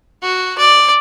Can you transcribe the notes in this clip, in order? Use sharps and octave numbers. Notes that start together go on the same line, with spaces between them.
F#4
D5